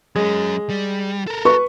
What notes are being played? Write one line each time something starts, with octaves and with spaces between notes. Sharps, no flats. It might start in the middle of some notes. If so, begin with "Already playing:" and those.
F#3 G#3 C#4
G3
A4 A#4
B4 C#6